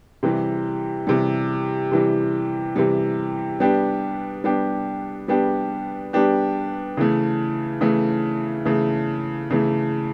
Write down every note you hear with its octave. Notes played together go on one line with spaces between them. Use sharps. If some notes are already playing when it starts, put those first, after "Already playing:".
C3 E3 G3
C3 E3 G3
C3 E3 G3
C3 E3 G3
G3 B3 D4 G4
G3 B3 D4 G4
G3 B3 D4 G4
G3 B3 D4 G4
C#3 E3 A3
C#3 E3 A3
C#3 E3 A3
C#3 E3 A3